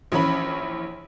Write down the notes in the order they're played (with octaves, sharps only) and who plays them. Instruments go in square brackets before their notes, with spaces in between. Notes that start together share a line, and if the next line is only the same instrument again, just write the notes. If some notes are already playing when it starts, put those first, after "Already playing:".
[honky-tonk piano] A#1 E3 C#4 B5